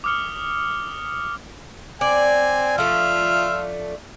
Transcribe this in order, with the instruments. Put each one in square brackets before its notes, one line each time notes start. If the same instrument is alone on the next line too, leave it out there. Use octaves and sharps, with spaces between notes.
[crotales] D6 D#6 F6 C#7 G7
[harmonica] C4 G#5 [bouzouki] D5
[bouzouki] F3 A3 D4 [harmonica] F4 E5 F6